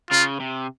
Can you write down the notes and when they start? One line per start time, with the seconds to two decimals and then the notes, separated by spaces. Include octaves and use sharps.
0.11 C#3 F4
0.40 C3